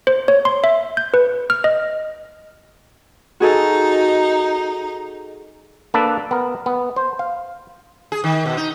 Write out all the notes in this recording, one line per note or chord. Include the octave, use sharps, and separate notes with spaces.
C5
C#5
C6
E5
G6
B4
F6
D#5
D#4 F#4 G#4 A4
A#3 D4 A4 B4
B3 A#4
B3
C5
F5
G#4
D#3
B2
D#4